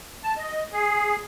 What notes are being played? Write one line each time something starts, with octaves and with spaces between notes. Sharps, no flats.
A5
D#5
G#4